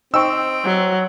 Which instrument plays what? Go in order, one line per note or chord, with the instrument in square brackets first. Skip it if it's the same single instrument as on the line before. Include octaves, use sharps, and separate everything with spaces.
[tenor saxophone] C4 [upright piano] D#4 G5 C#6 [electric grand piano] E6
[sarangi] F#3